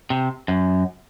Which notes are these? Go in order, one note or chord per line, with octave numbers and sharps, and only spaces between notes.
C3
F#2